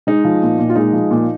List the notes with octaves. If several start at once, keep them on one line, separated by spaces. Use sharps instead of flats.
G#3 D#4
F3
A#2
A#2
F4
G#3 D#4
F3
A#2